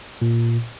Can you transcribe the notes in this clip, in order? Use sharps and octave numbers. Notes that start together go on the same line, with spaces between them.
A#2